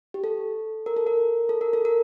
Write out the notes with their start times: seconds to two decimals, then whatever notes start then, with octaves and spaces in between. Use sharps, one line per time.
0.14 G4
0.24 A4
0.86 A#4
0.97 A4
1.07 A#4
1.49 A4
1.61 A#4
1.73 A4
1.85 A#4